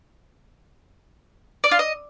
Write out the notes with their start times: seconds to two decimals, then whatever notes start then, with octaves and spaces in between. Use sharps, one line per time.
1.64 D5
1.71 F4
1.79 D#5